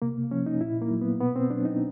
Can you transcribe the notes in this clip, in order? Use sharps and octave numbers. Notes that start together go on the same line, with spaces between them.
C3 A#3
F3 C#4
D#4
A#2 E4
A#3
F#3
B3
B2 B3
C4
F#3 D4
D#4